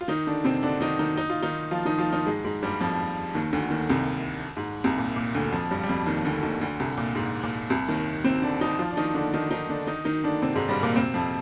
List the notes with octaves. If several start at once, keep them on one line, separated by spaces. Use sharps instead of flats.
F4
D#3 D#4
D3 D4
C3 C4
D3 D4
D#3 D#4
D#3 D#4
D#4
F4
D#3 D#4
F3 F4
D#3 D#4
F3 F4
D#3 D#4
G#2 G#3
G#2 G#3
G2 G3
F2 F3
D#2 D#3
D2 D3
D#2 D#3
C2 C3
G#2
C2 C3
A#2
A#2
D2 D3
F2 F3
G2 G3
G3
F2 F3
D#2 D#3
D2 D3
D#2 D#3
D2 D3
C2 C3
A#2
G#2
A#2
C2 C3
D#2 D#3
C3 C4
D3 D4
D#3 D#4
F3 F4
D4
D#3 D#4
D3 D4
D#3 D#4
D#3 D#4
D3 D4
D#3 D#4
D#3 D#4
D3 D4
C3 C4
G#2 G#3
G2 G3
A#2 A#3
C3 C4
F2 F3